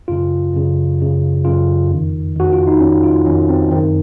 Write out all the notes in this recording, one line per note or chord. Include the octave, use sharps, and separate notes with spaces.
F#2 C#3 F4
F#2 C#3
F#2 C#3
F#2 C#3 F4
F2 D#3
F2 D#3 F#4
F4
D#4
F2 D#3 C#4
F4
F2 D#3 C#4
C4
F#2 D#3 C4